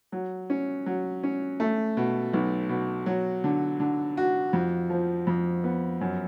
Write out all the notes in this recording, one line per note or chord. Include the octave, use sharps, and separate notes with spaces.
F#3
C#4
F#3
C#4
A3
B2
B1
B2
F#3
D3
D3
F#4
F2
F3
F2
B3
F#2